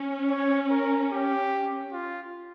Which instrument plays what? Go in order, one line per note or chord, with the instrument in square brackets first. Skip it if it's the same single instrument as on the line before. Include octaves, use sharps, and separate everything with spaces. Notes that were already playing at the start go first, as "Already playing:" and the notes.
Already playing: [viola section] C#4
[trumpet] C#5
A#4
G4
F4